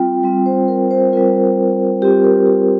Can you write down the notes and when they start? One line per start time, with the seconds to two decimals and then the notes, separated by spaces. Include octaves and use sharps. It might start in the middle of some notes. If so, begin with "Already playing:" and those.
Already playing: G3 C4 F4 G5
0.23 G3 C4 F4
0.46 C5
0.68 A#4
0.91 C5
1.13 G3 C4 F4 A#4
2.02 G3 C4 F4 G4
2.24 A#4
2.47 G4